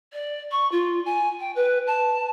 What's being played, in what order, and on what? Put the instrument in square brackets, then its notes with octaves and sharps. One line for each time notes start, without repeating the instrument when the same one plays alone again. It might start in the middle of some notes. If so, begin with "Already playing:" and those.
[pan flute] D5
C#6
F4
G#5
G5
B4
A5